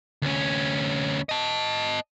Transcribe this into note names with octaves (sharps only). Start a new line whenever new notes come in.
D2 C#4
D#5 A5